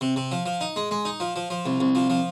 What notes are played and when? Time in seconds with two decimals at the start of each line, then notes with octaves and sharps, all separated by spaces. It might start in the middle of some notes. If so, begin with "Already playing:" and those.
0.01 C3
0.16 C3
0.32 F3
0.46 F3
0.61 D#4
0.76 G#3
0.91 G#3
1.05 D#4
1.20 F3
1.36 F3
1.50 F3
1.66 C2
1.80 C2
1.95 F3
2.10 F3